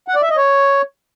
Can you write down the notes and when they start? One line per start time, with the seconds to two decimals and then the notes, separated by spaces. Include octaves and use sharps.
0.08 F#5
0.15 D5
0.22 E5
0.30 D#5
0.37 C#5